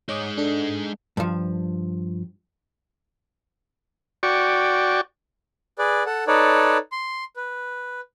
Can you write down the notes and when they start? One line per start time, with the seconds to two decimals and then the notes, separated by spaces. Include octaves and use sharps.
0.09 G#3 D#4 C#5 D6 D#6
0.38 D4 A4
1.17 G2 F3
4.23 F#4 D5 G5 C#6
5.79 G#4 B4 D5
6.06 A4 F#5
6.27 D#4 A4 B4 C#5 D5
6.92 C6
7.36 B4